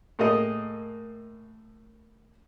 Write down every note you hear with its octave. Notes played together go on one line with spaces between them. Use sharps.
A2 A#3 G#4 D#5 D#6